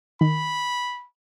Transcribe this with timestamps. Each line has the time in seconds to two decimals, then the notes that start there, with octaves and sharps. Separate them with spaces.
0.21 D#3 B5